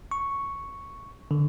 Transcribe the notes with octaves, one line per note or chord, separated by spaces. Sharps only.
C#6
D3